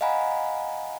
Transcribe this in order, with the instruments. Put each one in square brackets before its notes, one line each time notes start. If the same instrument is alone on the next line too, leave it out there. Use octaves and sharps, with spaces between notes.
[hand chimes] D#5 F5 F#5 G#5 A#5 B5